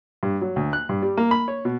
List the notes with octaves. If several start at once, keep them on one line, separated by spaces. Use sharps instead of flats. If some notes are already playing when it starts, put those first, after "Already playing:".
G2
F#3
D2
F#6
G2
G3
A#3
B5
C#5
B2